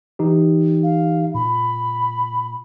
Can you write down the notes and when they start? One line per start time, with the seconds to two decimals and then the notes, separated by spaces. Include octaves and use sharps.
0.19 E3 D#4 G4
0.83 F5
1.35 A#2 B5